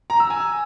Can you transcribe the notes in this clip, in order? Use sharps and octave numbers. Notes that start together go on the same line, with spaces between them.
A#5
E6
G#5